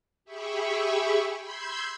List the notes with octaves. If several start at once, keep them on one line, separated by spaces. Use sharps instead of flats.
G4 G#4 E5 B5 C#6
B5 C6 E6 G6 G#6